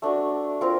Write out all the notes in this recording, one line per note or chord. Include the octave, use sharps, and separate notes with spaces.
A3 D4 F#4
C4 F4 A#4